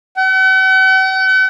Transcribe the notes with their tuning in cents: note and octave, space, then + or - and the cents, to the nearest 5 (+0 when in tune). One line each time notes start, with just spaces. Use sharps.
F#5 +45